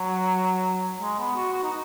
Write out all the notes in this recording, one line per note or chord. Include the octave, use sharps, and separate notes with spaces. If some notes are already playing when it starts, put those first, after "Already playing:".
Already playing: F#3
G#3
B3
F#4
F#4
D#4